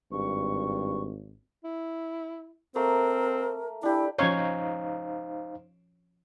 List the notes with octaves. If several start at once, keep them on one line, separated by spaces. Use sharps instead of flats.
G#1 G2 C#6
E4
A3 A#3 C4 A#4
D4 E4 G4
F3 C#4 D#4 C5 C#5 F5